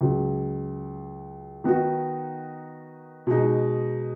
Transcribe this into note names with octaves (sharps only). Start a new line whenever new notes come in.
C#2 C#3 F#3
D#3 B3 D#4 F#4
B2 G#3 D#4